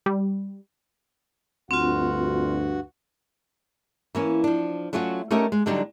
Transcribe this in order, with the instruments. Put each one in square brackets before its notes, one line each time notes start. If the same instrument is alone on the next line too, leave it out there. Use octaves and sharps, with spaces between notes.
[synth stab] G3
[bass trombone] D2 [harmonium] G2 F#4 F#5 [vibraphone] C4 F4
[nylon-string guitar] E3 A#3 C#4
F3 D4
F#3 A3 C#4 F4 F#4
A3 C#4 D#4 G4 A#4 E5
G#3
D3 F#3 G3 D4 D#4